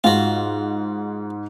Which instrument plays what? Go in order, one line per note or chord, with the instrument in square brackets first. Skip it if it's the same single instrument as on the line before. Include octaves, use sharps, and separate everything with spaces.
[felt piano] G#2 [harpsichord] F4 F#4